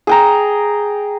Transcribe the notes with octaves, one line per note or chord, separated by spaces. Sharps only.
G#4 G5 A#5